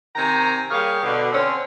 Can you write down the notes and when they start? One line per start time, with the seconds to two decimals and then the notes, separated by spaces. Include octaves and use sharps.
0.15 C3 D#3 G5 G#5 A#5
0.71 G3 A#3 G#4 C#5 F5
1.03 B2 D3
1.32 D3 C4 C#4